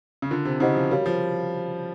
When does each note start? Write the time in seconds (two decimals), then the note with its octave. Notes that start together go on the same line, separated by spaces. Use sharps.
0.22 C#3
0.31 D3 D4 F4 A#4
0.45 C3
0.60 C#3 E4 G4 C5 D#5 F#5
0.75 F3
0.90 G3 F#4 A#4 C#5 F5
1.06 F3